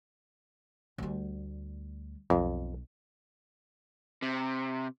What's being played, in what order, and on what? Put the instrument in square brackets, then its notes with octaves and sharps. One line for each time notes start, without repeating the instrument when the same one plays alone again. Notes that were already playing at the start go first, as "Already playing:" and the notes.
[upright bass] D2 G3
[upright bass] B1 [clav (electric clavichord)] F2
[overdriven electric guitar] C3